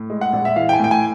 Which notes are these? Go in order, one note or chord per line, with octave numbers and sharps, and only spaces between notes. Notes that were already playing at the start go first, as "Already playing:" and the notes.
Already playing: A2
G#3
F#5
A#1
E5
E3 F5
G5
G#5
A2 G5
G#5